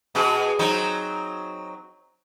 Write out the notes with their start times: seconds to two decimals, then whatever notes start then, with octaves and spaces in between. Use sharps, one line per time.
0.15 B2 F#4 G#4
0.59 F#3 C4 D#4